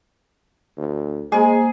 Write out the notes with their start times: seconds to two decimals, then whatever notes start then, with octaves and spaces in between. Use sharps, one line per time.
0.77 D2
1.32 G#3 A#3 G#4 C5 G#5